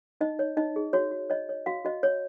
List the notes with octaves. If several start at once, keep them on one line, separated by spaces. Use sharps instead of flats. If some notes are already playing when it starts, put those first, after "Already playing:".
D#4 D#5
C#5
D#4 D#5
G#4
F#4 C#5
F#4
C#5 D#5
C#5
F#4 F5
F#4 D#5
C#5